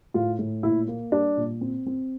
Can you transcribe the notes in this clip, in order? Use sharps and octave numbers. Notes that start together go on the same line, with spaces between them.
A2 F4
A2
A#2 E4
A#3
G3 D4
A#2
C4
C4